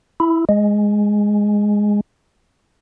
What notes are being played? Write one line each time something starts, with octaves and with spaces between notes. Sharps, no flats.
E4
G#3